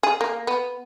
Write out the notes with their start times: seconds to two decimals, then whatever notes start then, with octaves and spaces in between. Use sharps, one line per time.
0.03 G#4
0.21 A#3
0.47 B3